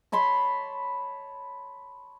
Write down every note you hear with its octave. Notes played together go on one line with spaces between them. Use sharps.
C#5 A5 B5 C6